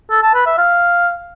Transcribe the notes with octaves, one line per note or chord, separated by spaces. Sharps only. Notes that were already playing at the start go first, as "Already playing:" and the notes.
A4
A5
B4
E5
F5